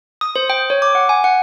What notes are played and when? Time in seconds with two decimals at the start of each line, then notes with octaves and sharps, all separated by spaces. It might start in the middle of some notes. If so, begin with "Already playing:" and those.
0.21 D#6
0.36 C5
0.50 G5
0.70 C#5
0.82 D6
0.95 F#5
1.09 G#5
1.24 F#5